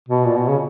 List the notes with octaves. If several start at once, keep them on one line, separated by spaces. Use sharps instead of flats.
B2
A#2
B2
C#3